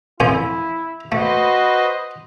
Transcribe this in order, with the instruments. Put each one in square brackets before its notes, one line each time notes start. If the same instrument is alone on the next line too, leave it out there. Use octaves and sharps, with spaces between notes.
[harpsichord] F2 C5 G#5 [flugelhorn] E4
[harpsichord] A3 [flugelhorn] F#4 [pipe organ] B4 C5 D#5